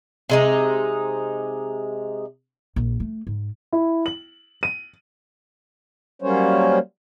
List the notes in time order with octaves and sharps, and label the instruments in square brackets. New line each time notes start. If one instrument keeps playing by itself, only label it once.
[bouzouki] C3 G#3 D#4
[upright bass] A#1
A3
G#2
[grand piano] E4
F#7
D#7
[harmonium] F#3 G3 A#3 C#4 C5 C#5